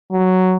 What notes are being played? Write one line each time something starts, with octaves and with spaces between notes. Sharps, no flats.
F#3